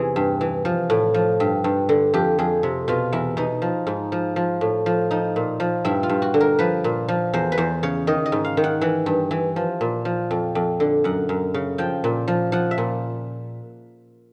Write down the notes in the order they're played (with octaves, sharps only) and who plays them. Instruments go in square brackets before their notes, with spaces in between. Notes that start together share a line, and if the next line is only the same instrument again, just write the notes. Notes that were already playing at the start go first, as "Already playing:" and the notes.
Already playing: [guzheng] E2 C3 E3 G#4
G2
E3
F3
A2
F3
G2
G2
D3
F2 G4
F2 G#4
C3
B2 F4
E2 E4
B2 D#4
F3
G#2
F3
F3
A2
F3
F3 D#4
A#2
F3
G2 E4
F4
G2
F#4
D3
A#4
F3 B4
A#2
F3
E2 C5
B4
E2 C5
C#3 C#5
D#3 D#5
D#5
G#2
F5
D#3
F#5
E3 F#5
G2
E3
F3
A#2
F3
F2
F2
D3
F#2 F#5
F#2
C#3
F3 G5
A#2
F3
F3 F#5
E5
A#2